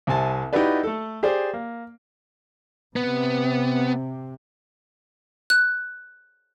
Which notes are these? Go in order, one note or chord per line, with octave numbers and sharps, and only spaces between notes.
C2 C3 G#5 A5
D#4 E4 F#4 G4 B4 D5
A3 A4
G4 G#4 C5 D5
A#3
C3 B3
F#6